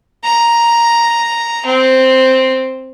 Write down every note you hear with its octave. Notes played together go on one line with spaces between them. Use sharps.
A#5
C4